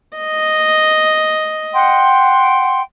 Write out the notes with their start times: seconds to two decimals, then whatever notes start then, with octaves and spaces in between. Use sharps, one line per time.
0.18 D#5
1.73 F#5 G5 C6